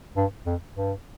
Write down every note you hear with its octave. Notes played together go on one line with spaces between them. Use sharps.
G2
F2
G2